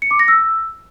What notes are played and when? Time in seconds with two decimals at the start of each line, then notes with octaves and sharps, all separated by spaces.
0.02 C#7
0.11 D6
0.19 A#6
0.28 E6